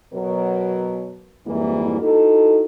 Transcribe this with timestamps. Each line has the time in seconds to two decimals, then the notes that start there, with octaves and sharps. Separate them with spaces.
0.14 B2 F#3 A#4
1.47 F2 G#2 E3 G3 A#3 E4
2.00 D#4 E4 F#4 A4